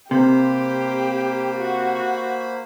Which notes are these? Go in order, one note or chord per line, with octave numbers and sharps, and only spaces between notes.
C3 A#3 G4 C5 B5
F#4